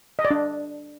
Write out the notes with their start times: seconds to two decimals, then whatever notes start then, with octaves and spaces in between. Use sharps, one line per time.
0.19 D#5
0.25 D5
0.31 D4